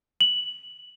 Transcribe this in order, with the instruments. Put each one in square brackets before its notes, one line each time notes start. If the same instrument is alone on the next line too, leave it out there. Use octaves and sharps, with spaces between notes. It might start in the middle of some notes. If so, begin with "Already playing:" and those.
[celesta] F#7